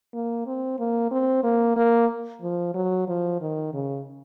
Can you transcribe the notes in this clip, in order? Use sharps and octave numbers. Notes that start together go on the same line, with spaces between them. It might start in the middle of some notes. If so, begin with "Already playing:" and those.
A#3
C4
A#3
C4
A#3
A#3
F3
F#3
F3
D#3
C#3